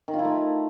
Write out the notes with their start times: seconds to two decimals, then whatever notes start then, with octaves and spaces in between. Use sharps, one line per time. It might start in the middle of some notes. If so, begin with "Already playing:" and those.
0.08 D#3
0.13 F4
0.19 E4
0.25 A3